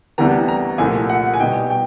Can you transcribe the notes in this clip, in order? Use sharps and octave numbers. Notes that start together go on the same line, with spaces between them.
D2 C3 E3 G3 B3 A#5
A#5
C2 A#2 F3 A3 G#5
F#5
G#5
B2 G3 B3 D#4 G5
G5